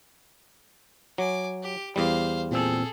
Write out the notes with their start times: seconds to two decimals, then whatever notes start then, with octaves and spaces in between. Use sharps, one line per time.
1.18 F#3 G#5 D6
1.63 G4
1.96 E2 G3 C5 F5
2.51 A#2 C4 G#4 A4 E6